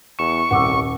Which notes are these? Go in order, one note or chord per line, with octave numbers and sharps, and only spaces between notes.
E2 C#6 E7
D#1 C2 F#5 D6 E6